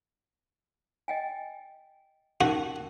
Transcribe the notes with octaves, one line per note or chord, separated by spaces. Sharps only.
D#5 G5 G#5
C#4 D#4 F#4 A#4